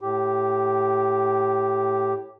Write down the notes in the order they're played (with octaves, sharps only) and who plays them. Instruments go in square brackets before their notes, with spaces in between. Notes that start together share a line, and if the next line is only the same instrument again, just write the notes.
[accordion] A2 G4